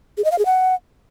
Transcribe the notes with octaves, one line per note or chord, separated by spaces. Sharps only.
G#4
D#5
F5
G#4
F#5